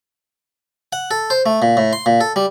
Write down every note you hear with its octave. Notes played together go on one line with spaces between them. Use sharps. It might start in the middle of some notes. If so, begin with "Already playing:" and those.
F#5
A4
C5
A3
A#2
A2
C6
A#2
A4
G3